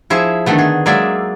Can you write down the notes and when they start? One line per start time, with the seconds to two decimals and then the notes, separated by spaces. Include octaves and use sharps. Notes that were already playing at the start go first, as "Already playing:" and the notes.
0.10 F3 E4 G#4 E5
0.46 D3 D#3 A3 B3
0.59 G#4
0.86 F#3 G#3 A#3 G#4 D5 E5